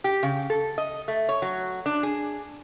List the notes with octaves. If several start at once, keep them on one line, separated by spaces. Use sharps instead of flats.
G4
C#3
A4
D#5
A3
C#5
F#3
D4
G#4